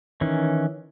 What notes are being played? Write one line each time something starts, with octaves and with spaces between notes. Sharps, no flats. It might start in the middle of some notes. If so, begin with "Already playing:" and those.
D#3 E3 C#4